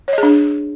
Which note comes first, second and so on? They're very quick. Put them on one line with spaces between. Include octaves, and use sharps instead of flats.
C#5 D#5 G#4 D4